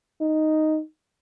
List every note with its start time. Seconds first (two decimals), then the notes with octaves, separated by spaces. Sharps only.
0.21 D#4